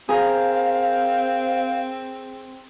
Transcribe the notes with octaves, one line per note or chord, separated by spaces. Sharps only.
C4 G#4 A#4 C5 F5